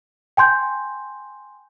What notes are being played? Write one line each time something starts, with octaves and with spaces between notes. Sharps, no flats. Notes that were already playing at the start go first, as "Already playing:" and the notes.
G5 G#5 C6 G6